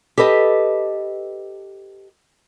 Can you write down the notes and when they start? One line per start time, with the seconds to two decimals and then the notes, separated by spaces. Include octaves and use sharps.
0.18 G4 A4 B4 D#5